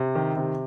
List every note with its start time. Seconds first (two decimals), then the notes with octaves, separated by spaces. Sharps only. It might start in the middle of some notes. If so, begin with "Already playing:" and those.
Already playing: C3
0.15 D#3
0.37 C3